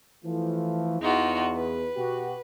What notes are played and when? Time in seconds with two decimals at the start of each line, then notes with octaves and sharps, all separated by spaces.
0.24 E3 F3 A3
1.00 E2 D#4 F4 F#4
1.55 B4
1.96 B2 F#4 G4